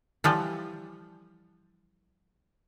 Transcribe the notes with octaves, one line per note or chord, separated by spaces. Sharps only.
E3 F3 G3